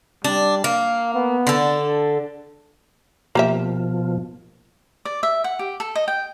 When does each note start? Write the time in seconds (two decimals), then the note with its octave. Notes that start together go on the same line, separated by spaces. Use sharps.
0.24 G3 D4
0.64 A#3 F5
1.14 B3
1.47 D3 A4
1.77 D4
3.35 B2 F3 A#3 G4 E5
5.05 D5
5.23 E5
5.44 F#5
5.59 G4
5.80 A4
5.95 D#5
6.08 G5